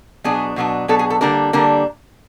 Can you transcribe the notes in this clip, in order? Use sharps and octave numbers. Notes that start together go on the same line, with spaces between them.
B2 F#3 B3 D4 G#4
B2 F#3 B3 D4
B2 F#3 B3 D4 A4
G#4
A4
D3 G3 A#3 D4 A#4
D3 G3 A#3 D4 A#4